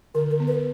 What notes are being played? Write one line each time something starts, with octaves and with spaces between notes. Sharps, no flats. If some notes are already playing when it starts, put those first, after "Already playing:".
D3 A#4
A#4
B3
B4